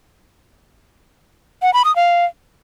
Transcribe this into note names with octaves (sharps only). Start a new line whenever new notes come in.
F#5
B5
D#6
F5